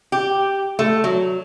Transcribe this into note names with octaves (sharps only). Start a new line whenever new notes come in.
G4
A3
F#3